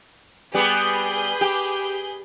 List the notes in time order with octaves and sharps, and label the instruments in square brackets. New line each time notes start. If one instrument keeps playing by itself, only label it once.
[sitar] G3 B3 G4 [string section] G#4 B4 G6
[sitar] G4